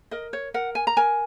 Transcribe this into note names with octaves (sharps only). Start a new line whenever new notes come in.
A#4 D#5
C#5
A#4 F#5
G#5
A#5
A#4 G#5